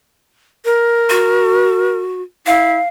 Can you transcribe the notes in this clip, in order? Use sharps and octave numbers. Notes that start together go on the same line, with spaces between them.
A#4
F#4
E4 F5